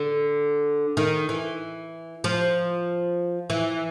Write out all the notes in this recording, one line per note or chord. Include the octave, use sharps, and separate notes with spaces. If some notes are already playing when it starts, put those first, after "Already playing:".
Already playing: D3
D#3
E3
F3
E3